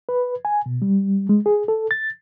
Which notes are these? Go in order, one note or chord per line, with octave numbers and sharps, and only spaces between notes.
B4
G#5
B2
G3
G#3
G#4
A4
A6